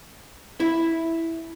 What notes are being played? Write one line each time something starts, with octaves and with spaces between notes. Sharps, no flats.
E4